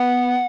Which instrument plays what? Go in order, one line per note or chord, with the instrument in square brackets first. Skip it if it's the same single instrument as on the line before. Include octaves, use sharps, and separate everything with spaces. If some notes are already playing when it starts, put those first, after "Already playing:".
Already playing: [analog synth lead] B3 [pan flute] F#5